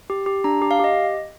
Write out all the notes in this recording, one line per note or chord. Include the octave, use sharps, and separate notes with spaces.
G4
G4
D4 A#5
G4
F5
G4 D#5